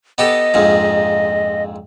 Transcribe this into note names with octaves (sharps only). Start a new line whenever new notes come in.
B3 G4 A4 D#5
A#1 F2 G#2